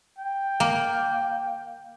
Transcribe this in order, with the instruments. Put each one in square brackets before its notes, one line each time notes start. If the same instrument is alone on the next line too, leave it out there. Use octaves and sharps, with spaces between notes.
[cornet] G5
[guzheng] A#3